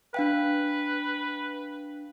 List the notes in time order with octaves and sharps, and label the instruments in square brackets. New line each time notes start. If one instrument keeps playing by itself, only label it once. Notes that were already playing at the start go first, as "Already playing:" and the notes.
[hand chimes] D4 F5 G5 [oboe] B4